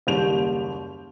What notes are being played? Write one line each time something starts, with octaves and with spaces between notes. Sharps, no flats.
F#1 D#2 G3 G6 D7 F7